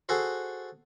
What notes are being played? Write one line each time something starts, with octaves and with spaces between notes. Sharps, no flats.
F#4 G#4 A4 C5